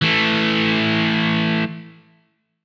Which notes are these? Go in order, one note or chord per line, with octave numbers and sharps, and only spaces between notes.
E3 A3